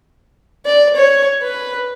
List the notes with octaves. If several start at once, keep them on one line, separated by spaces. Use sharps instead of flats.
D5
C#5
B4